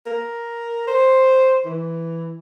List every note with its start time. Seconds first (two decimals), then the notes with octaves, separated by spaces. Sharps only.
0.06 A#4
0.87 C5
1.65 E3